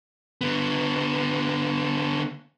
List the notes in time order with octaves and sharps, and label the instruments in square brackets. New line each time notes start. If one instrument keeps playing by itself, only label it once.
[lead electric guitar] D3 B3